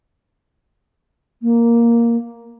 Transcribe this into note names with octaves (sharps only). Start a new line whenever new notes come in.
A#3